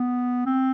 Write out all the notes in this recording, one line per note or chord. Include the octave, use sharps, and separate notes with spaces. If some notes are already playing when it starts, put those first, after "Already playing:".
Already playing: B3
C4